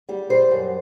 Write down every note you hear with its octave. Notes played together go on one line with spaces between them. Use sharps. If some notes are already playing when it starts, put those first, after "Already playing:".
G3 G4
G3 C5
F#2